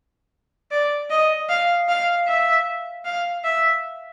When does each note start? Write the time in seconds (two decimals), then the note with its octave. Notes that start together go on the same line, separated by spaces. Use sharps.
0.71 D5
1.10 D#5
1.49 F5
1.88 F5
2.27 E5
3.05 F5
3.44 E5